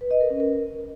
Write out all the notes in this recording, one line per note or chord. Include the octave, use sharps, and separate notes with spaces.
B4
D#5
A#4
C#4
A#4